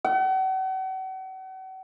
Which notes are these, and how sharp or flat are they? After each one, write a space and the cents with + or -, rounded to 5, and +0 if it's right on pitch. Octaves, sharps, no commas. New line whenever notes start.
F#5 +40